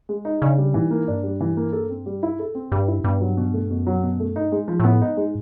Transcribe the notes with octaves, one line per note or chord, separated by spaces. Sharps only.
G#3
D#4
C#3 D4
G3
G#2 E3
A#3
G2 D4
G3
E3
A#3
A4
C4
G3
E4
A4
C4
G2 G3
E4
G2 B2
F#3
B2
A3
F#2 B2
F#3
B2
A3
G2 D#4
G#3
G#2
F3
A2 B3
G#2 D#4
G#3